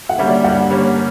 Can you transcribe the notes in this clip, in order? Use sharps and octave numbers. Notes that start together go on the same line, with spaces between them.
F#5
D3 G3 A#3 C#4 E5
D5
G2 F#5
D3 G3 A#3 C#4